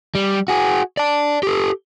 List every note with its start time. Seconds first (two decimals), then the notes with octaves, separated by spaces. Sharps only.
0.15 G3
0.48 F#4 G#4
0.97 D5 A5
1.43 G4 A4